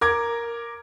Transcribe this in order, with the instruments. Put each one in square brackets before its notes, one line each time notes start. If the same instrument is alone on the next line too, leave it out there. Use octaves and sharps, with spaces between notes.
[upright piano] A#4 D6 G#6